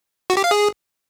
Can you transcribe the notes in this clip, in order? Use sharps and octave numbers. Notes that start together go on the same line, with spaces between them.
F#4
G4
F5
G#4